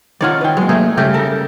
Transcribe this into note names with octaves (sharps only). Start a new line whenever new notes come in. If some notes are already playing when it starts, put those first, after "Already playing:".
D#3 D#4 F4 C#5 D5 F#5
B4 G5
F#3 G#3 A#3
A3 D#4 G#4
G2 C#3 A3 G4
A4 A#4